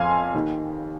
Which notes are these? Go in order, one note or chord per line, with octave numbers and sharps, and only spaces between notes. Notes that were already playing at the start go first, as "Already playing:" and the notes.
Already playing: F2 F3 F5 G#5 C6
D#2 D#3